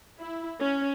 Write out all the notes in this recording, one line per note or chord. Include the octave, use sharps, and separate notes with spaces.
E4
C#4